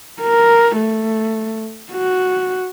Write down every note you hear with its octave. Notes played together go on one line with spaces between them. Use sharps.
A#4
A3
F#4